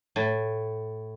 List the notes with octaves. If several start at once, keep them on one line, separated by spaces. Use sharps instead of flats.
A2